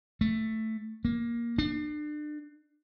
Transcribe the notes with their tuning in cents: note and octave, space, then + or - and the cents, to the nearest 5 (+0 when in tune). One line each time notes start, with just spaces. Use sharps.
A3 +5
A#3 +10
D4 +35